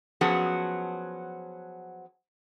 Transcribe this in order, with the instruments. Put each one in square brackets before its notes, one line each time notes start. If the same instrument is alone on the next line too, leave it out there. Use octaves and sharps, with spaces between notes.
[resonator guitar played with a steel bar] F3 F#3 B3 C#4 F#4 G#4